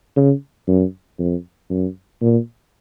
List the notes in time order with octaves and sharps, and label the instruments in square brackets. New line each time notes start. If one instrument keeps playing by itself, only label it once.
[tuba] C#3
F#2
F2
F#2
A#2